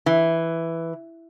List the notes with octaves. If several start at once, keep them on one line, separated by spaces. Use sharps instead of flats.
E3